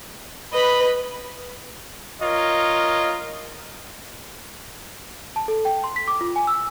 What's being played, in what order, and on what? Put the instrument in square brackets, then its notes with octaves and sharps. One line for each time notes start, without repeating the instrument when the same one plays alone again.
[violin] B4 [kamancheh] D#5 B5
[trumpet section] F4 A#4 C#5 D#5
[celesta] A5
A4
G5
C6
B6
D6
F4
G#5
E6